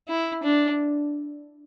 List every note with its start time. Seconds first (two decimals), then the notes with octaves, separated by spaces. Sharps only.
0.08 E4
0.43 D4